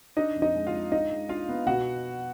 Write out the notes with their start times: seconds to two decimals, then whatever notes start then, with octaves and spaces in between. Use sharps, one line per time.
0.17 D4 D#4 D#5
0.36 F2
0.42 D#4 D#5
0.55 G#3
0.67 F4 F5
0.74 G#3
0.92 D4 D#4 D#5
1.12 G#3
1.29 D4 F4 F5
1.49 B3
1.67 B2 F#4 F#5